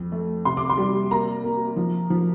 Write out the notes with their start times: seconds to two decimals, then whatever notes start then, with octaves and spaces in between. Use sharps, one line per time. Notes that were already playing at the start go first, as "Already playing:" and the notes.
Already playing: F2
0.12 A3
0.45 C3 C6
0.57 D6
0.70 C6
0.78 G3
1.11 A#3 A#5
1.44 A#3
1.76 F3
2.10 F3